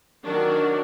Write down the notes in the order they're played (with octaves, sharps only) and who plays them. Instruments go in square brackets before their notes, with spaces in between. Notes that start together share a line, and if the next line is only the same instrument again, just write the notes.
[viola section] D#3 F#3 D4 F#4 A#4 D5